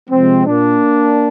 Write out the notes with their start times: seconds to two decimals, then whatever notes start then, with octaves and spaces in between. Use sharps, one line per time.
0.10 C3 F3 G#3 C4
0.46 A#2 A#3 D4